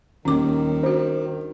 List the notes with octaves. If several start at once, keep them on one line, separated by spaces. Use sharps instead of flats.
D#1 D#2 D#3 C#4 D6
D4 F#4 C5